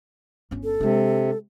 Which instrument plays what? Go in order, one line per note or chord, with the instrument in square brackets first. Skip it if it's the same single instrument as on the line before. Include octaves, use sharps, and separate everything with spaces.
[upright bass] G1 C#4
[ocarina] A4
[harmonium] C3 [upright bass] G#3 D4